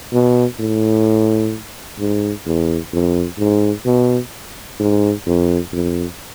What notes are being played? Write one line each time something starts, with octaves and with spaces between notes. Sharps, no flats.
B2
A2
G#2
E2
F2
G#2
B2
G#2
F2
F2